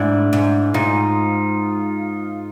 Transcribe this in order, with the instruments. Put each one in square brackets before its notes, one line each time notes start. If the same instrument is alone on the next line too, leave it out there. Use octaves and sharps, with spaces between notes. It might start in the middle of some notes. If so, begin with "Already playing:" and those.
Already playing: [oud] G#2 [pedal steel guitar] D4 E4
[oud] G#2
[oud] G#2 [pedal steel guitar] D#4 F4